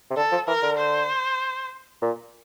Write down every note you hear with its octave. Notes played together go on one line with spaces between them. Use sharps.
C3
D3 A4
F3
E3 A#4
D3
C5
A#2